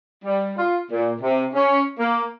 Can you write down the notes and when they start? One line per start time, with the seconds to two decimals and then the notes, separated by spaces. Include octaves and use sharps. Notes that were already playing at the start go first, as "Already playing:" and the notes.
0.25 G3
0.58 F4
0.91 A#2
1.21 C3
1.54 C#4
1.99 A#3